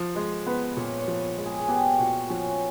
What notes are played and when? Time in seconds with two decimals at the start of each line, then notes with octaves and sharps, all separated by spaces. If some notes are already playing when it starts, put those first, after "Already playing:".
Already playing: F3
0.15 G#3 C5
0.46 B3 B4
0.77 A#2 C#5
1.00 C#5
1.08 F3
1.22 C#5
1.38 G#3
1.46 G#4
1.60 G#4
1.68 B3 G4
1.99 A#2 F#4
2.30 F3 C#4